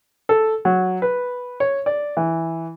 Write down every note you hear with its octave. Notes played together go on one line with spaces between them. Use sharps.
A4
F#3
B4
C#5
D5
E3